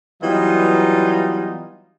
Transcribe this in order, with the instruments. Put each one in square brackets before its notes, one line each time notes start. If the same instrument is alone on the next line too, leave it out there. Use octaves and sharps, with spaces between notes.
[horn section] E3 F#3 G3 B3 D#4 F4